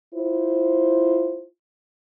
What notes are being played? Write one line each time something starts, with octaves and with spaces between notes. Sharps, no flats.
E4 F4 C5